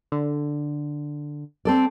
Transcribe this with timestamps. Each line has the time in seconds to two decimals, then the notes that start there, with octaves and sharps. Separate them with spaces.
0.12 D3
1.65 C4 A4 D5